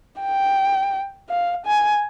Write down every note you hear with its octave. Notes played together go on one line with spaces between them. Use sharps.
G5
F5
G#5